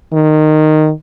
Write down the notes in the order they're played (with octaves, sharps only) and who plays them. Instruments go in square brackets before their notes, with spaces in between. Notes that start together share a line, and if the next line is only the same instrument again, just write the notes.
[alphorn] D#3